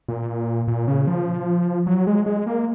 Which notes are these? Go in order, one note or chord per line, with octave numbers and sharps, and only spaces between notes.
A#2
A#2
C#3
F3
F#3
G#3
G#3
A#3